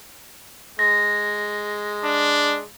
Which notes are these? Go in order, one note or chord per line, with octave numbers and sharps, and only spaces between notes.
G#3 A#6
D4